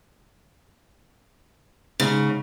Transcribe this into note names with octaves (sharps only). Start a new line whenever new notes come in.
G#2 C#3